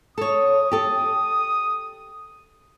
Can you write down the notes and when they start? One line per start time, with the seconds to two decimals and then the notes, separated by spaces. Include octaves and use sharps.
0.18 A4 C#5 D#6
0.71 G4 A4